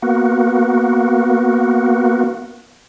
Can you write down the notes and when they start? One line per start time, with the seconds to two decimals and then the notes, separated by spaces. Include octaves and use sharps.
0.02 A#3 B3 F#4